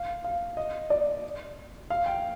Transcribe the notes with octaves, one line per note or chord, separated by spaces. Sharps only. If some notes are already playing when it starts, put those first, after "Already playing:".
Already playing: F5
F5
D#5
D5
F5
G5